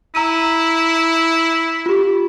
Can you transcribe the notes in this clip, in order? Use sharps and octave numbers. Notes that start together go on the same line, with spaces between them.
E4 A#5 E6 D#7
F4 G4